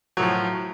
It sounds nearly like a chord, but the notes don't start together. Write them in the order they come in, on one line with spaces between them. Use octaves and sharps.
F#3 A2 F3